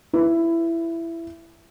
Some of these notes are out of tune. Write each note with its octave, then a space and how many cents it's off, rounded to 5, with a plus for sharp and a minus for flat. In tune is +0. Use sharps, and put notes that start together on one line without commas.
E4 +15 B4 +0